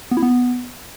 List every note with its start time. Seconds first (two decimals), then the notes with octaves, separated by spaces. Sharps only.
0.11 B3
0.17 E4
0.23 B3